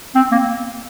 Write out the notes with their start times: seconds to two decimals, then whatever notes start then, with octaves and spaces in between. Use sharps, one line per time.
0.15 C4
0.32 A#3